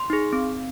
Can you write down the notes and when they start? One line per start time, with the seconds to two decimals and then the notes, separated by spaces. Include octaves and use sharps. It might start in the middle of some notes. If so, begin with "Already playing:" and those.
Already playing: C6
0.10 D#4 G#4
0.33 C4